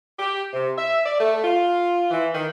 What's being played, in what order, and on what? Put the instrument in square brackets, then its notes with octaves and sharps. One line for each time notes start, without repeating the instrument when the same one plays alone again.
[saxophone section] G4
C3
E5
D5
A3
F4
E3
D#3